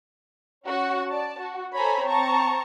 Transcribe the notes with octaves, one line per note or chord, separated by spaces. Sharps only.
C#4 F#4 F#5
D5 A5
F#4
A4 C5 C#5 G#5 A#5 B5
C4 A5 A#5 C#6